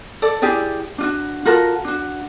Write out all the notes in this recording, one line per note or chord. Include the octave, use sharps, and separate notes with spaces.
A4 D5
E4 G4 G#4 D5
D4 F4 F#4
F4 F#4 A4 A#4
D4 F#4